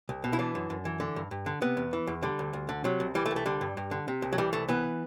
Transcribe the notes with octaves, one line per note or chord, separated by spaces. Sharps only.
C2
B2
E4
E3 D4
F#2
F#2
E3
D3
G2
G2
D3
C3 B3
E2
E3
E2
D3 G3
D2
D2
D3
C3 F#3
C2
E3 G3
A3
C2
A3
D3 G3
G2
G2
D3
C3
C2
F#3
E3 G3
C2 A3
E3 B3